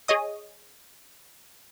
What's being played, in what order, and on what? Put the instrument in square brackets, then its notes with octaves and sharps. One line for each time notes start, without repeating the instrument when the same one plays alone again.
[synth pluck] G#4 C#5 D#5 D#6